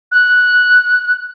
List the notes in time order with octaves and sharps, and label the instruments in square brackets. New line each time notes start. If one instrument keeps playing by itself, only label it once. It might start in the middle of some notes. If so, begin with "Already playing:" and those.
[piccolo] F#6